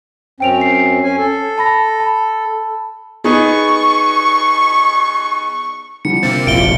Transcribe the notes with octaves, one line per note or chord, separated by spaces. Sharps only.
F#2 C4 C#4 G5 D7 F7
C7
C#4 G#5
A4
A5 B5 A#6
A5 B5
B3 D#4 G#4 C#6
D3 F3 G3 C#7
C3 A#3 C4 A6
F1 A#1 F3 F4 E5 F5 D7 G7